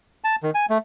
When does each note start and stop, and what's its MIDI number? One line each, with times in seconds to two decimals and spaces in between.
0.24 0.36 81
0.43 0.50 51
0.55 0.66 80
0.70 0.78 57